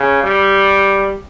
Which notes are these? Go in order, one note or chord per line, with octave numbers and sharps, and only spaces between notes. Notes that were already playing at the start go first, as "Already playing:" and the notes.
Already playing: C#3
G3